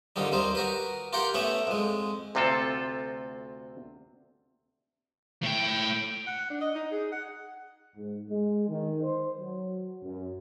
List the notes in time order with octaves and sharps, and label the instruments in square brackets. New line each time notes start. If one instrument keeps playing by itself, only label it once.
[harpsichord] F2 D3 D#3 G3 D#4
D#2 G3 D#4 C5
F#4 A#4 B4
F4 G4 A#4 F#5 G5
A3 B3 C#4 E5
F2 G#3
[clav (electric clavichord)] D2 C3 C4 F4 A4
[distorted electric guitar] A2 G5
[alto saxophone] F#5
D4
D#5
D#4
G#4
F#5
[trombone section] G#2
G#3
D#3
C5
F#3
F#2